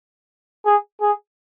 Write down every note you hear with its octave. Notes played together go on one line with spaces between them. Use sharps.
G#4
G#4